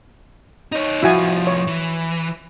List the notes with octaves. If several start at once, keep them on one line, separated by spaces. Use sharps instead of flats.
D#4 C#5
C2 F3 E4 F#4 G#5
C#5
E3